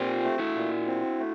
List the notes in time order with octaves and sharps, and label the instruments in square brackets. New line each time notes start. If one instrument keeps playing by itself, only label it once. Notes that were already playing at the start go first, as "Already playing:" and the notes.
Already playing: [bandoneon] A#2 C4 [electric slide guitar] F4 G4
[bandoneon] A3
[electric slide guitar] E4 F#4
[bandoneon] A#2
C4
A3